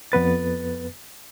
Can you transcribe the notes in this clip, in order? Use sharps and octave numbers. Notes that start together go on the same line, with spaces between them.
F2 B3 B4 A6